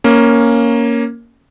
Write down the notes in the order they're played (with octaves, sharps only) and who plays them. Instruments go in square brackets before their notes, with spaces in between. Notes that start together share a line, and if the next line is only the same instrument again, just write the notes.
[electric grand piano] A#3 C#4